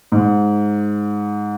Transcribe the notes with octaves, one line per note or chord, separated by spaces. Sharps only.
G#2